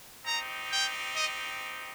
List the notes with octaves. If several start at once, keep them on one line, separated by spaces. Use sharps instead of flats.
C4 D#4 G4 A#5
G5
D#5